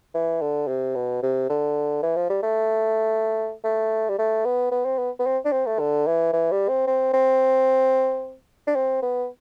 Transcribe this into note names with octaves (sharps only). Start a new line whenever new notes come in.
E3
D3
C3
B2
C3
D3
E3
F3
G3
A3
A3
G3
A3
B3
B3
C4
B3
B3
C4
D4
C4
A3
D3
E3
E3
G3
C4
C4
C4
D4
C4
B3